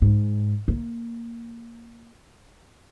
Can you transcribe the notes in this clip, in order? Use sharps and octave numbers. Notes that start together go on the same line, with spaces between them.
G#2
A#3